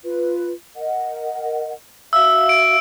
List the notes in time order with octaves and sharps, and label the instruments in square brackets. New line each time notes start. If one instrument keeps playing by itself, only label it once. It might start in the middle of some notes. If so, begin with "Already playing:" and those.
[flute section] F4 B4
A#4 D#5 F#5
[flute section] F#4 E5 F5 [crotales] E6
[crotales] D7